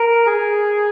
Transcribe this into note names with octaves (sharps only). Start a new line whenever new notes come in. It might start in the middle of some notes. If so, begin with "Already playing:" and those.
Already playing: A#4
G#4